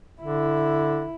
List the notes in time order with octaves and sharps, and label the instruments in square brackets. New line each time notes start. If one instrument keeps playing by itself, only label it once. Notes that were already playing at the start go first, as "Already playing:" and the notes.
[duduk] D3 [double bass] E4